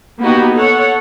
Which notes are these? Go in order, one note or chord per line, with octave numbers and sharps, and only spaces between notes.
A#3 B3 D#4 F#4 G4
A4 C#5 F#5